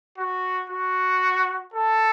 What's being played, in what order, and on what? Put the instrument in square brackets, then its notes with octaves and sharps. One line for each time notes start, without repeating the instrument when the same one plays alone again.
[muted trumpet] F#4
F#4
A4